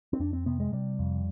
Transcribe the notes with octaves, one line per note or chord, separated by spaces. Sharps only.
C4
F2 D4
C4
C3 B3
G#3
C3 G3
F2